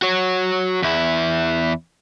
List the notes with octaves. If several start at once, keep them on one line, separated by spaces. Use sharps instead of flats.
F#4 C#5
E2 E4